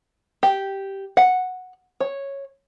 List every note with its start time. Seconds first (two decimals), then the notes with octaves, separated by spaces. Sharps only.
0.43 G4
1.17 F#5
2.00 C#5